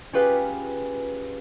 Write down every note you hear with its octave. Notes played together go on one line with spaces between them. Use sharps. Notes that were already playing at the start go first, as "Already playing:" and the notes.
C#4 F4 G4 G#4 B4 F5